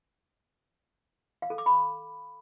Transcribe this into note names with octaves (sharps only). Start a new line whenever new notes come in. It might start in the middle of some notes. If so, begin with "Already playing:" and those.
F5
A4
D6
B5